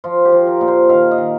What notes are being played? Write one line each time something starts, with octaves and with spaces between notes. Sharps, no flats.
F3 F4
G4
F3
A#4
A#2
C5
D#3 F5
D#5
D#3